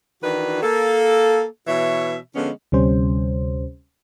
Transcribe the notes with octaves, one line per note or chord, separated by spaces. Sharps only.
D#3 E3 D4 F#4 B4
A#3 A4
B2 E3 C#5 E5
D3 F3 G#3 B3 C#4
D2 C3 G3 C#4 C5